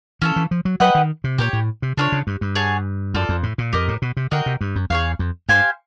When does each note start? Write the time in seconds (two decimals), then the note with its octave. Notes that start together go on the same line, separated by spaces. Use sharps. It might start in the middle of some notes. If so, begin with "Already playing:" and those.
0.22 E3 C#4 F4 A4
0.36 E3
0.51 F3
0.65 F#3
0.80 F#3 G4 B4 D#5 F#5
0.95 D#3
1.24 C3
1.38 A#2 G4 A#4 C#5
1.53 A2
1.82 C3
1.97 C#3 D4 F4 A4 C#5
2.12 C#3
2.27 G2
2.41 G2
2.55 G#4 C#5 F#5 A5
3.14 F#2 F4 A4 D5
3.29 F2
3.43 A2
3.58 A#2
3.73 F2 G4 A#4 D#5
3.88 A2
4.02 B2
4.17 C3
4.31 D3 F#4 A#4 D#5 G5
4.46 C3
4.61 G2
4.76 F#2
4.90 E2 G#4 C#5 F5
5.19 F2
5.49 G2 G4 C5 F5 G#5